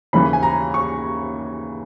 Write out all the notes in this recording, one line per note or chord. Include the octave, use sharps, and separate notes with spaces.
D#2 C#3 E3 B5
G#5
A#5
C#6